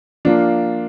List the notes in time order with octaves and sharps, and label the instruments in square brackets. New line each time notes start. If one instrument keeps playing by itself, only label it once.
[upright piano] F3 A#3 F4 [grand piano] D4